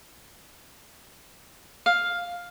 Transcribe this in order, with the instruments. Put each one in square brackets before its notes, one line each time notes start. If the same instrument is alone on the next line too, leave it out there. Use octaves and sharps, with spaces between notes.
[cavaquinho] F5